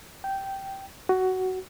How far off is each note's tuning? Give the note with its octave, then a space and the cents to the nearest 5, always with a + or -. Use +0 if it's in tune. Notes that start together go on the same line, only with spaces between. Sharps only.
G5 -10
F#4 +10